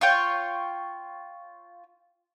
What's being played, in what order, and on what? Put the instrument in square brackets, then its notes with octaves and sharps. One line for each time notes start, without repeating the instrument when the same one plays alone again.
[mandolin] F4 C#5 G5